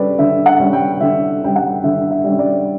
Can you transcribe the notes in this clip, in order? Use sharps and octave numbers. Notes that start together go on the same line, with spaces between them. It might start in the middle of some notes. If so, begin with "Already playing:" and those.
Already playing: D3 G3 C#4 A4 B4 D5
D3 E5
F#5
G3 C#4
G5
D3 E5
G3 C#4 G5
F#5
D3 E5
E5
G3 C#4
D5